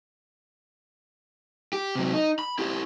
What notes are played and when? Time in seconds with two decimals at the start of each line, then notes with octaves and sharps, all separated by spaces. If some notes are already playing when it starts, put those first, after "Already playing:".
1.73 G4
1.96 C3 F#3
2.13 D#4
2.39 B5
2.59 E4 G4